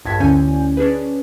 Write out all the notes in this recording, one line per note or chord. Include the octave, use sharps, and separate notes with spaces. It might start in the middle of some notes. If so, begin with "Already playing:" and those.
A#1 G2 A5 G#6 B6
D2 D3 C#4 E4 G#5 G6
C#4 D4 G#4 B4